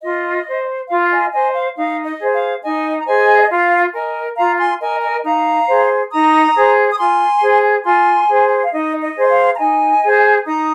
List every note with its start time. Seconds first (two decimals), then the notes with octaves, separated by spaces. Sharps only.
0.02 F4 D#5
0.46 C5
0.89 F4 F5
1.11 D#5 G#5
1.33 C5 D#5 G#5
1.55 F5
1.76 D#4 F5
2.05 D#5
2.20 G#4 C5
2.34 F5
2.63 D#4 D#5 G#5
3.01 A#5
3.07 G#4 C5 D#5 G#5
3.42 D#5
3.50 F4 F5
3.94 A#4 D#5 G#5
4.37 F4 F5 A#5
4.59 G#5 C6
4.81 A#4 D#5 G#5
5.02 D#5 G#5
5.23 D#4 F5 A#5
5.68 G#4 C5
6.11 D#4 A#5 D#6
6.55 G#4 C5
6.91 D#6
6.98 F4 G#5 C6
7.41 G#4 C5
7.84 F4 G#5 C6
8.28 G#4 C5
8.62 F5
8.71 D#4 D#5
9.01 D#5
9.15 G#4 C5
9.29 F5
9.54 A#5
9.58 D#4 D#5 G#5
10.02 G#4 C5
10.45 D#4 A#5 D#6